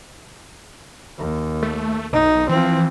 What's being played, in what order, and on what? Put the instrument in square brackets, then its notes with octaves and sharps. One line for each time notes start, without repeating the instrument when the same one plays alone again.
[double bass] D#2
[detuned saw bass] A3
[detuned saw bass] B1 [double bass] D#4
[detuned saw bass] E3 [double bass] F3 C4